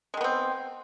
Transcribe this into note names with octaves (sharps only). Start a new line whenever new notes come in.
D#3 G#3 B3 C4